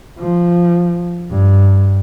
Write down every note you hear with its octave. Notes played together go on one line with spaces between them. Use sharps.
F3
G2